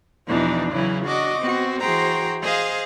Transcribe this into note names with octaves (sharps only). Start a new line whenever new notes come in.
E2 B2 E3 F3 D4 D#4
C#3 E3 F#3 E4
D4 F#4 D#5 D6
B3 C4 F#4
E3 F#4 G#4 C5 G5 A#5
G#4 C5 D#5 F5